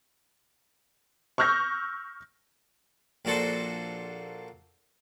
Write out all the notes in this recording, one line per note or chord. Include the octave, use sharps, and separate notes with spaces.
C#6 E6 F6 G6 A#6
A#1 A#2 F#4 A4 C5